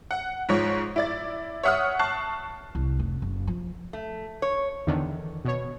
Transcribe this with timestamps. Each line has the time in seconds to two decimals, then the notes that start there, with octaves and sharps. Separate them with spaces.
0.11 F#5
0.49 G#2 F3 C#5 C#6
0.96 E4 D5 A6
1.63 C#5 E5 F#5 D#6 F6
1.99 A5 C#6 F#6 C7
2.75 C2
2.99 F1
3.22 F#1
3.47 F3
3.93 A3
4.42 C#5
4.87 E2 D3 D#3
5.45 B2 C#5